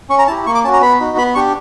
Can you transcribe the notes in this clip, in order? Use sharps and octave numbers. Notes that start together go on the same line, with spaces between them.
C#4 C#6
A#5
E4 G4 A5
A#3 C#6
D6
C#4 F#4 A5
A#5
B3 B5
D#4 F#4
B3 B5
D4 G4 C#6